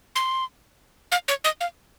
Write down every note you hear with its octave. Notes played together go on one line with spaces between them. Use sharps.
C6
F5
C#5
D#5
F5